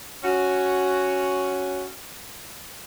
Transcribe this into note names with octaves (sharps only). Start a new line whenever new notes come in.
C#4 F#4